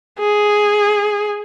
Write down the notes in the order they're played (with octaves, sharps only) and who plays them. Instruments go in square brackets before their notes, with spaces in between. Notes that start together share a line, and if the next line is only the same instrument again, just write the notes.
[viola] G#4